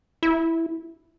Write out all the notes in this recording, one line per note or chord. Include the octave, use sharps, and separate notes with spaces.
E4